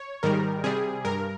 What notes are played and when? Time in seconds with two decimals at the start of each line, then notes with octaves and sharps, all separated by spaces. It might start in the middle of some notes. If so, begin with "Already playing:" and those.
Already playing: C#5
0.23 G#2 D#3 G3 A#4
0.64 C3 G3 G#4
1.05 G2 A#4